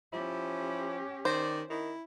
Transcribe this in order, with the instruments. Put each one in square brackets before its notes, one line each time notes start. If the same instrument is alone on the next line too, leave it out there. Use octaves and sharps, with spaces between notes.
[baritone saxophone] F3 [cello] C#4 G4 [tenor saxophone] E4
[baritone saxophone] D#3 [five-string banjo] C5 [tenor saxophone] D5
[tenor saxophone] D#3 [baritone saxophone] E4